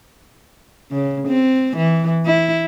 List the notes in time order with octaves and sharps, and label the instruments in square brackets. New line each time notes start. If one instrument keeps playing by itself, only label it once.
[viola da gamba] C#3
C4
E3
E4